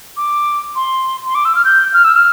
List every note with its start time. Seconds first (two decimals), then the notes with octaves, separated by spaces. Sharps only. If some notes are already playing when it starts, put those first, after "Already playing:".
0.17 D6
0.76 C6
1.26 C6
1.35 D6
1.45 E6
1.55 F6
1.65 G6
1.93 F6
2.04 E6
2.16 F6